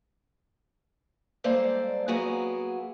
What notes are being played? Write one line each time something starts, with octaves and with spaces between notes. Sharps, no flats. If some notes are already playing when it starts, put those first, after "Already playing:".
G2 G#3 A#3 A4 C5 D5
F#3 A#3 B3 F#4 G#4